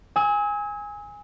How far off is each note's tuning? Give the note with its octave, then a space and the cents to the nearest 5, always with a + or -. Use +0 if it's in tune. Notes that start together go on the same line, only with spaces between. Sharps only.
G#5 -10 E6 -45